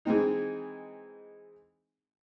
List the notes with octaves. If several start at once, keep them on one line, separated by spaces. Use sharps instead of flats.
E3 G#3 C4 D#4